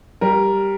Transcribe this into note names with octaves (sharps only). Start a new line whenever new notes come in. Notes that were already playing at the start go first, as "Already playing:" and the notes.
G3 A#4